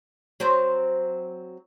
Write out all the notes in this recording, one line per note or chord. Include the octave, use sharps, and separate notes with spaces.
F#3 C4 C5